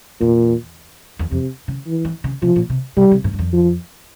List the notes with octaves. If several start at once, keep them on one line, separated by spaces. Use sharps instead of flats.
E2 A#2
E2
F2 C3
C#3
E3
E3
C#3
C3 F3
A#2
C3
C3 G3
C3
G#2
G2
F2
F3